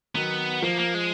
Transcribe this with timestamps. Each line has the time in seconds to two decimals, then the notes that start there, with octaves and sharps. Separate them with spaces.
0.15 D#3 F#3 B3
0.62 F3 A#3
0.78 A#3
0.94 G#3